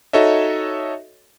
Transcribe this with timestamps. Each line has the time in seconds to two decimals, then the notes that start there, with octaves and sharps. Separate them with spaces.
0.13 D#4 F#4 A4 C#5 D#5 E5